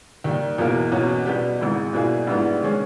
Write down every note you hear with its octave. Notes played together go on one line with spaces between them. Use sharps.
D#2 D#3 G3
E2 B2 A#3 E4 A#4
E2 B2 A#3 C#4
B2 G3 B3 G4
G#1 G#2 E3
B2 G3 A#3 E4 G#4
A#1 G#2 G3 B3 E4
D#3 G#3 C#4